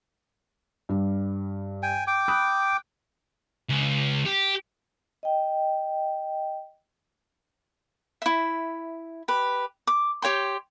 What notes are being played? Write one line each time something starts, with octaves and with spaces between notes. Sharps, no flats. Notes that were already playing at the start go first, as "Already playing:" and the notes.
G2 G3
G5 G#5
G5 D6
B5 D#6 F#6
C#2
G4
D#5 G5
E4 E5
G4 B4
D6
G4 C#5 G5 C6